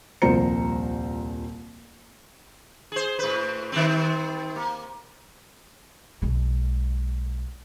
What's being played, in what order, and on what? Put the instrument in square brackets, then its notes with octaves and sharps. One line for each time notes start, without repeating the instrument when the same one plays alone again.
[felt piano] D#1 C2 F3 C5 A#5 C#7
[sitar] G#4 C5
A2 B4
D#3 G3 C4
A#3
[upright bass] B1 G#3